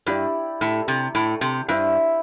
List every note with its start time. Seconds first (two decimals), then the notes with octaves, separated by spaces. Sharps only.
0.06 G2 E4 G4 D5
0.61 A2
0.88 C3
1.15 A2
1.41 C3
1.68 G2 E4 C5 E5